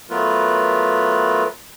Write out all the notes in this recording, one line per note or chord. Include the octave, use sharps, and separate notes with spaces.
F#3 A3 B3 F4 A#4 B4